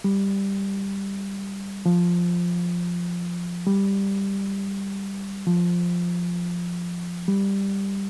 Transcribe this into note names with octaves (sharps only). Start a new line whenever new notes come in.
G3
F3
G3
F3
G3